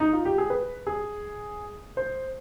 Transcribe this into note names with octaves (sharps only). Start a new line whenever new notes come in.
D#4
F4
G4
G#4
B4
G#4
C5